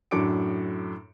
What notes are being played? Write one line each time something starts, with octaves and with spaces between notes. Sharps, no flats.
F#2 A2 D4 D6 C#7 D7